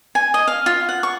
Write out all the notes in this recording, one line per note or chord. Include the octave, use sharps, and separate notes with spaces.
G#5
D#5
F5
F4
F#5
C#6